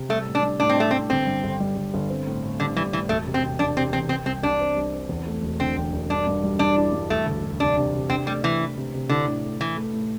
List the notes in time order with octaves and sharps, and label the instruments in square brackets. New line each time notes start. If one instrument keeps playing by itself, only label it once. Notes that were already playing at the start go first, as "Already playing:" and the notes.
Already playing: [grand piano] C3
[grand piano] G3 [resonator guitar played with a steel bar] A3
[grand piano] A2
[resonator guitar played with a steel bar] D4
[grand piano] G3
[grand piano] A2 [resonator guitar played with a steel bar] D4
[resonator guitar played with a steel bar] C4
[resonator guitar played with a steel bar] A3 [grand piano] D4
[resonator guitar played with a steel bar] C4
[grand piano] A2
[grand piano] G1 [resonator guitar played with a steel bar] C4
[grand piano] G2
G1
G3
G1
G1
C4
A2
A2
[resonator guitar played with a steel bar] D3 [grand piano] G3
[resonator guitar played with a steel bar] E3 [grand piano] G3
[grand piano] A2 [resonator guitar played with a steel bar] E3
[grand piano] E1 [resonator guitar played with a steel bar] A3
[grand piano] C3
[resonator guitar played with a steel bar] C4
[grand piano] C3
[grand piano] E1 [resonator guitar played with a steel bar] D4
[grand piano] C3 [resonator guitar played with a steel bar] C4
[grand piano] E2 [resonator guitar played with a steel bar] C4
[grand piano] C3 [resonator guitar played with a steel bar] C4
[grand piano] C2 [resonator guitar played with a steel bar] C4
[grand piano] C2 [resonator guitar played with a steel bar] D4
[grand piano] C4
C2
C4
E2
A3
E1
[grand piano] D3 [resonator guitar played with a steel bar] C4
[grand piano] E1
E1
[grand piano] G2 [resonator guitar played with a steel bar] D4
[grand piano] G2
G3
[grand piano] G3 [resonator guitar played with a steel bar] D4
[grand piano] E4
G2
[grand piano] E1 [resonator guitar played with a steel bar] A3
[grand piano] D2
E1
[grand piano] C3 [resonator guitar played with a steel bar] D4
[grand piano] C3
C3
[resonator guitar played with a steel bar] C4 [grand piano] D4
[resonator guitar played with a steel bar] G3 [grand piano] A3
[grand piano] C3 [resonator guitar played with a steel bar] E3
[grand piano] D4
C3
C3
[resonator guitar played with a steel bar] D3 [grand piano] E4
[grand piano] A2
A3
[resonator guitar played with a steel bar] E3 [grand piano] A3
[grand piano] A3
A2